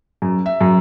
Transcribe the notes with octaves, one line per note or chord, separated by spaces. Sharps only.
F#2
E5
F#2